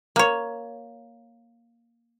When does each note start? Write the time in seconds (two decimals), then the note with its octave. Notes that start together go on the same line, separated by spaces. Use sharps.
0.16 A#3 C#5